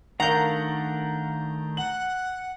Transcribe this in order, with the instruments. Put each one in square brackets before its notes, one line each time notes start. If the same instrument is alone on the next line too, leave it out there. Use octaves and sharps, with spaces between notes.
[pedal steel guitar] D#3 A3 D4 [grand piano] A#4 F5 F#5 [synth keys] A#5 G6
[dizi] F#5 [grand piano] F#7